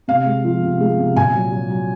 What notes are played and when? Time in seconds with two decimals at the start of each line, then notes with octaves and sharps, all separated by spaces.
0.08 C3 F5
0.26 G#3
0.44 F3
0.63 C3
0.80 G#3
0.98 C3
1.16 A#2 G#5
1.34 F#3
1.52 F#3
1.70 F#3